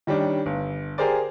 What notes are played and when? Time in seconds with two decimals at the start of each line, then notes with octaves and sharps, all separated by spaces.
0.07 D#3 G3 C#4 D4
0.46 G1
0.98 G4 G#4 A#4 C5 D5